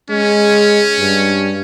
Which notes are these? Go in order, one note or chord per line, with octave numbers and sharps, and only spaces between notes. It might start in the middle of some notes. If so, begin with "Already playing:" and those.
G#3 C#4
G2